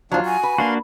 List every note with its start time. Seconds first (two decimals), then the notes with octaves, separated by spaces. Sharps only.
0.11 D#2 F3 F#3 D4 F4
0.25 F#4 G#5
0.43 B4
0.58 A#3 D4 F#4 F5 C6